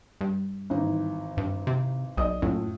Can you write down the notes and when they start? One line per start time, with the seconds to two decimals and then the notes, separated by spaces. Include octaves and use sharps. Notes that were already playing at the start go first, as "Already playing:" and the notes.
0.21 G2
0.70 G#1 E3 D#4
1.37 G2
1.67 C3
2.17 B1 D5 D#5 D#6
2.42 F#2 A2 A3 F4